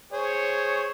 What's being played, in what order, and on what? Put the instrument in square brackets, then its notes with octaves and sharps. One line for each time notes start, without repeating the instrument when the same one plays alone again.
[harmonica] G#4 C5 [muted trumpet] C#5